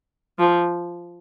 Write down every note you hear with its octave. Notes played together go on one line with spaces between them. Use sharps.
F3